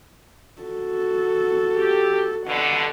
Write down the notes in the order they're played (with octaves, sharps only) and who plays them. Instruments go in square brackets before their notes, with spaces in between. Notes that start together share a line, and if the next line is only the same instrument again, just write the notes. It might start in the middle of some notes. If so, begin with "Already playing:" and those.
[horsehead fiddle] F#4 A4
[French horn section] G4
[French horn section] G2 B2 D3 [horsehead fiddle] F#5